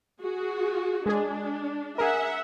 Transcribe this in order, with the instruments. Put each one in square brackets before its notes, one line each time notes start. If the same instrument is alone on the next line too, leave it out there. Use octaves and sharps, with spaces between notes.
[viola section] F#4 G#4
[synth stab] G#3 G#4 [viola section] D4
[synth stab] G#4 A#4 [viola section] E5 F#5